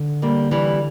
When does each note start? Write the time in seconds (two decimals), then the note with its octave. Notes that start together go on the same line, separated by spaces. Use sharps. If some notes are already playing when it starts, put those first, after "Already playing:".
Already playing: D3
0.22 G3 A#3
0.51 E3 G3